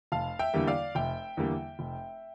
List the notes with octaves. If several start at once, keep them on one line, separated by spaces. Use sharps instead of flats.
F1 F5 A5
E5 G5
E2 D3 G3 A#3
D5 F5
F1 E5 G5
E2 D3 G3 A#3
F1